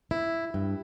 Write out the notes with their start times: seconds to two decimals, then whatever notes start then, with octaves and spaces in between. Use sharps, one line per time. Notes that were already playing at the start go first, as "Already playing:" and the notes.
0.11 E4
0.54 G2